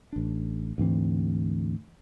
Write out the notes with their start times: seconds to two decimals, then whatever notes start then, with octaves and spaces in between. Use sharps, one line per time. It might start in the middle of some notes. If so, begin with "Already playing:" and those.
0.13 A1 D4
0.78 D2 G#2 E3 C4